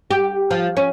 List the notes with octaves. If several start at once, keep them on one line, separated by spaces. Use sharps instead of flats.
G4
F3
C#4